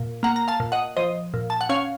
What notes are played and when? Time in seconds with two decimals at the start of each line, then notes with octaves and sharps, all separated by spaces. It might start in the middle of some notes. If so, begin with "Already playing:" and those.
Already playing: A#2
0.23 A#3 F#5 A#5
0.36 A#5
0.48 F5 A5
0.60 A#2
0.72 D#5 F#5
0.97 F3 C5 D#5
1.34 A#2
1.50 A5
1.61 F#5
1.69 C#4 C#5 F5